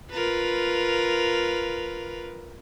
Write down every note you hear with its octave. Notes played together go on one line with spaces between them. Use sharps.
F4 A#4 B4